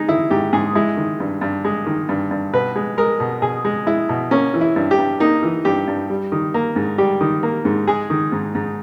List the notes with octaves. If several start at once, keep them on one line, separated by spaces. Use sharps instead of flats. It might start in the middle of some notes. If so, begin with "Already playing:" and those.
Already playing: G#3 D#4
D#3 E4
G#2 G4
G#2 G#4
G#3 E4
D#3
G2
G2
G#3
D#3
G2
G2
B2 B4
G#3
G#3 A#4
B2
B2 G#4
G#3
G#3 E4
B2
A#3 C#4
E3
E4
G2
G4
G2
A#3 D#4
E3
G2 G4
G2
G3
D#3
A#3
G#2
G3 G4
D#3
A#3
G#2
G#3 G#4
D#3
G#2
G#2